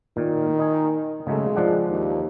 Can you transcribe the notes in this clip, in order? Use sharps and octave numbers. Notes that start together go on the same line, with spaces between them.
A#2 D#3
D#4 G#5
C#3 F#3 G#3 A3
F3 D4 F#5
D#2